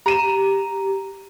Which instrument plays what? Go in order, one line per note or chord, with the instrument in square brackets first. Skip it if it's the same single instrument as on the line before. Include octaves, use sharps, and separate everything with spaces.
[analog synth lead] G4 [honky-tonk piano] A#5 D#7 E7